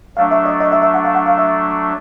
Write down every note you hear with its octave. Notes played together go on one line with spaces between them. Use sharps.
F#3 A3 D4 F5
E5
D#5
D#5
E5
E5
F#5
F5
F#5
F5
E5